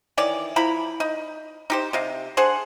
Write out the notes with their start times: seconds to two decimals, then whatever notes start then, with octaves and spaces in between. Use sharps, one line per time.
0.17 D#3 E3 C#5 D5
0.56 F3 E4 A#5 B5
1.00 D#4
1.70 D#4 G4 C5
1.93 C3 D#5 F5
2.37 D4 G#4 C5 F#5